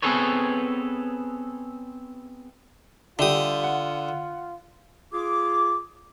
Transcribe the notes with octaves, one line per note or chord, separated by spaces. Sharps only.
B3 C4 G#4 A4 B4 C#5
D3 G3 F4 G4 E5 D#6
F#5
F4 G#4 D6